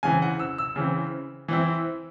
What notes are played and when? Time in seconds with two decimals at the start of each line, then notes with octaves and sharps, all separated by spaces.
0.03 C#3 E3 C4 G#5
0.22 F#5
0.39 E6
0.58 E6
0.76 C#3 E3 C4
1.48 E3 C4 E4